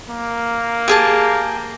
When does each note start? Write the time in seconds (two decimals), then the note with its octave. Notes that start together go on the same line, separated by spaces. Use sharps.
0.10 A#3
0.88 G4 G#4 A5